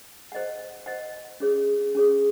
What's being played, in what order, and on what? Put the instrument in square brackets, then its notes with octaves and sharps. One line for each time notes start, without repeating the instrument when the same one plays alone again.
[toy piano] C5 D#5 F#5
C5 D#5 F#5
C#4 G#4 C#5
C#4 G#4 C#5